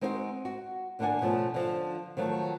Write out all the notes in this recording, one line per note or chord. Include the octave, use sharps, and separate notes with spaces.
G#3 C4 D#4 E4 F#4 C5
F#4
D#2 D3 A#3 D4 F#5 G#5
B2 F3 A3 C#4
D3 F3
D#3 F3 F#3 A3